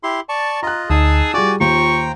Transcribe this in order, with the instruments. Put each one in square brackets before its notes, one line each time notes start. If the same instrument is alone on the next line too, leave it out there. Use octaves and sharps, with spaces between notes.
[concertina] E4 G4 C6
D5 A5 C#6
[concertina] F4 D#5 [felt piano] A#5 F#6
[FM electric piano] D2 [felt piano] D#4 [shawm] G#4 [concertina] A5 D#6 E6
[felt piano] G3 G#4 [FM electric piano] F4 [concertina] F#4 G#5 [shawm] D5
[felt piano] D#2 [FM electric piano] F4 [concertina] C5 G5 A#5 [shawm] C#6